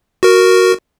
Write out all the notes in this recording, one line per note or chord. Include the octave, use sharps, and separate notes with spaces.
F#4 A#4